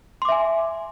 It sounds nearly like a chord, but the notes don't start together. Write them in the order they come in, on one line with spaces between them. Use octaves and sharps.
C6 D6 E5 G#5